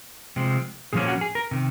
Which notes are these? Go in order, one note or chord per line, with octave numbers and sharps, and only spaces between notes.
C3 F3 G#3 C4
A#2 F3 A#3 C#4 G#4
F#4
G#4
A#4
C3 D#3